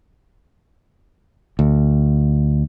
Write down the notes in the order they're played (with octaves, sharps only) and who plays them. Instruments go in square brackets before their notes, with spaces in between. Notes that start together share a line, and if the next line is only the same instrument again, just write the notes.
[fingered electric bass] D2